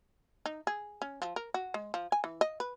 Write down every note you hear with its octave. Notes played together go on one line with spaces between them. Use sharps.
D#4
G#4
C#4
F3
A#4
F#4
G#3
F3
G#5
E3
D#5
B4